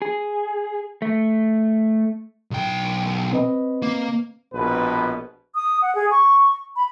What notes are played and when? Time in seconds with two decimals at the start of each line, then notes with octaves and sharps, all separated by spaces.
0.02 G#4
1.02 A3
2.51 B1 G5
3.33 C4 B4 D#5
3.82 A#3
4.52 A#1 B2 B4
5.55 D#6
5.82 F#5
5.95 G#4
6.11 C#6
6.76 B5